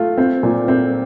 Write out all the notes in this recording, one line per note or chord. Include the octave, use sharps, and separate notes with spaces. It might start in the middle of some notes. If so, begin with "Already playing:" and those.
Already playing: A3 F4
C4
A#2
C4